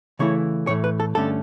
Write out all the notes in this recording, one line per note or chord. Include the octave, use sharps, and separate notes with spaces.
C#3 E3 A3 E4 C#5
A2 E3 A3 C#5
B4
A4
G2 D3 A3 C#4 A4